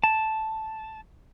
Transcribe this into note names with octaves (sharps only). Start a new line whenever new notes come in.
A5